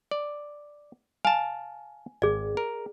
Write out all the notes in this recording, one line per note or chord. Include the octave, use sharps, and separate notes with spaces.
D5
F5 G#5 A5
G#1 G#4 D5
A#4